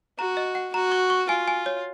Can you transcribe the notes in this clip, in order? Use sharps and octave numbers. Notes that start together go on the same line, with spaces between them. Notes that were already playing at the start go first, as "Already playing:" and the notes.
F#4 A#5
D#5
F#5
F#4 A#5
C#6
C#6
F4 G#5
G#5
C#5